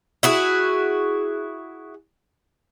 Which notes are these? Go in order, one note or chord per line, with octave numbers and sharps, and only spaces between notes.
E4 F#4 G#4